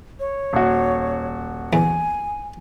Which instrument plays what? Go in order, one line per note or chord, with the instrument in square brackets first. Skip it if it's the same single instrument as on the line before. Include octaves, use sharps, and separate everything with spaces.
[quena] C#5
[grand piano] D#1 F#4
[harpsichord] E2 [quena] G#5